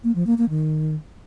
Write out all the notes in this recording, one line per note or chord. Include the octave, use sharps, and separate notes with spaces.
A#3
F3
A#3
A#3
D#3